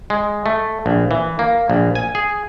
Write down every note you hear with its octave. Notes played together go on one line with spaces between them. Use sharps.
G#3
A3
A#1
E3
A#3
A#1
G#5
G#4